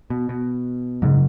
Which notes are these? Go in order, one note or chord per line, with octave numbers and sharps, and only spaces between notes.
B2
B2
G#2 C#3 F#3